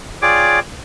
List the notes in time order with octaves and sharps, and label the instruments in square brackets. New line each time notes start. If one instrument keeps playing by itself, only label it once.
[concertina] F4 G#4 C#5 D5 G5 D6